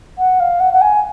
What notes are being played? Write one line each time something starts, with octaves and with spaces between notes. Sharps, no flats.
F#5
F5
F#5
F#5
G#5